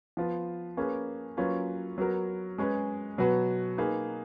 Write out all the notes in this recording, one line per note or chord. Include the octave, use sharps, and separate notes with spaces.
F3 B3 F4
A#3 C#4 G#4 B4
F#3 A#3 C#4 F4 B4
F#3 B3 F#4 A#4
G#3 C#4 G#4 B4
B2 F#3 B3 F#4 B4
A#3 D#4 G#4 B4